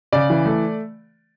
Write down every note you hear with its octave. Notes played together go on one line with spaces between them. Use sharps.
C#3 D5
E3
A3